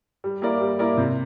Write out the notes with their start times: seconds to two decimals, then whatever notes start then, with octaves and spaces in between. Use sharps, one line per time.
0.24 G3
0.42 A#3 E4 A#4 D5
0.61 G3
0.79 A#3 E4 A#4 D5
0.97 C3